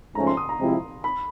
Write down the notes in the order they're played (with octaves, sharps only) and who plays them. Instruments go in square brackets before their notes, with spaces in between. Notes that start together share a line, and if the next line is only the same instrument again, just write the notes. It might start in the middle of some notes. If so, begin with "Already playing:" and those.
[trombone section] G#2 F3 A3 C#4 [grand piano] A#5
[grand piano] C6
D#6
A#5
[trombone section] C3 F3 G#3 C4 E4
[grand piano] B5